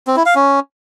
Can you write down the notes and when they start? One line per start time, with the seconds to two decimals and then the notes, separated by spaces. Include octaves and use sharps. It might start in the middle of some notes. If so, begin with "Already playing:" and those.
0.07 C4
0.16 E4
0.26 F5
0.35 C#4